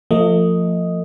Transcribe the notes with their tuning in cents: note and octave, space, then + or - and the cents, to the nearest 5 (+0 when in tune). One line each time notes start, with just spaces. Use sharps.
F3 +0 A3 +40 D#5 +5